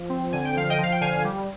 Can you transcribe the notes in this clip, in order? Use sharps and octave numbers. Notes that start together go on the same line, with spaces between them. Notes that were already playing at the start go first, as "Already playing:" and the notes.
Already playing: F3
C4
D3 G#5
G5
F3 F5
D#5 G5
F3
F5
G5
D3 F5 G#5
G3